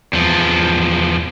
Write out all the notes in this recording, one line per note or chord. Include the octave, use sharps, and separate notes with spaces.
E2 F3